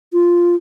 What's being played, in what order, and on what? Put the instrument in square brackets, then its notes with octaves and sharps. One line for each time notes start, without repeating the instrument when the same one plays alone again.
[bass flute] F4